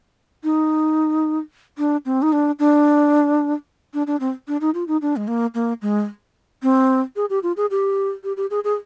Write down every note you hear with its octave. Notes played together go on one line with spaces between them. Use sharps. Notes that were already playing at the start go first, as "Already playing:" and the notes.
D#4
D4
C4
D#4
D4
D4
D4
D4
C4
D4
D#4
F4
D#4
D4
G#3
A#3
A#3
G#3
C4
G#4
G4
F4
G#4
G4
G4
G4
G#4
G#4